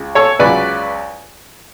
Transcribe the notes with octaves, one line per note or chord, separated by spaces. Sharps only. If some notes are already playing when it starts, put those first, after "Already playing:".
Already playing: C#2 C#3
A4 C#5
C#2 C#3 F#3 B4 D5